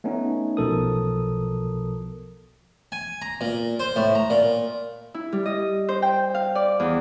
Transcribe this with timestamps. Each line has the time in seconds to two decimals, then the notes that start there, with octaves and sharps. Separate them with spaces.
0.04 A3 B3 C#4 D#4
0.57 B1 B2 F3 A4 A#4 D#6
2.92 G#5
3.22 A#5
3.41 A#2
3.80 C5
3.96 A2
4.15 A#5
4.30 A#2
5.14 E4
5.32 G3
5.46 D#5
5.89 C5
6.02 G5
6.35 F5
6.55 D5
6.80 E2